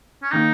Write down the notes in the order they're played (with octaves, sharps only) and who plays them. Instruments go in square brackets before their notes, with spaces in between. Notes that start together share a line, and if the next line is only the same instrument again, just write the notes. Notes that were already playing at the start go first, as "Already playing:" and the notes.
[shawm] C#4
[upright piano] D#3 A#3 [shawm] D#4